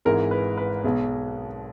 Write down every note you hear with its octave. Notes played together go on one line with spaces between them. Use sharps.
G#1 G#2 E3 G#3 A#4
B4
B4
B1 B2 G#3